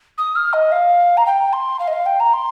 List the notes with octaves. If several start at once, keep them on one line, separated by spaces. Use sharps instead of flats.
D#6
F6
D#5
F5
A#5
G5
C6
F5
D#5
F5
G5
A#5
C6